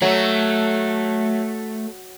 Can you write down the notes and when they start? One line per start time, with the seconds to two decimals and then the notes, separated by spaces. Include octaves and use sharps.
0.02 F#3 A3